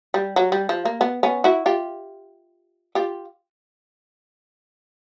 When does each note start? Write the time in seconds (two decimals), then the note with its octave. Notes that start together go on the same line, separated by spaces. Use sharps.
0.14 G3
0.36 F#3
0.52 G3
0.69 F3
0.85 A#3
1.01 B3
1.23 B3 C#4
1.44 E4 F#4
1.66 F4 G4
2.95 F4 G4